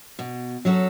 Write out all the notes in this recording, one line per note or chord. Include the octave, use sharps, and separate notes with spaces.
B2
F#3 C#4 F#4 A4